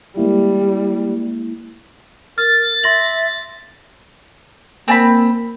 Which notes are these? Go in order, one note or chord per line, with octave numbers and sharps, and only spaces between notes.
G3 G#3 A#3 E4
A#4 F6 A6
E5 C6 A#6 F#7
A#3 C4 A5 B5